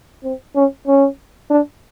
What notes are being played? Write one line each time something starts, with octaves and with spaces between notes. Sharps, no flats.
C4
C#4
C#4
D4